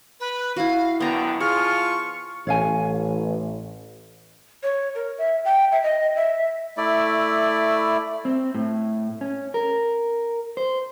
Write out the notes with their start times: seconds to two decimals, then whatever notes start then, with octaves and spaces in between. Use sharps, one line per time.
0.20 B4
0.56 E4 F#4 F5
1.00 F#2 D3 B3 G5 A#5
1.41 F3 F4 G#4 C#6 F6
2.47 A1 C#5 F5 G#5
4.63 C#5
4.95 A#4
5.18 E5
5.45 G5
5.72 E5
5.83 D#5
6.16 E5
6.77 A3 E4 D5
8.25 C4
8.54 A2
9.21 C#4
9.54 A#4
10.57 C5